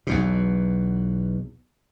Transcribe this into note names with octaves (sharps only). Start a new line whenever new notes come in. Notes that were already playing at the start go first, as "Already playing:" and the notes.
B1 E2 B2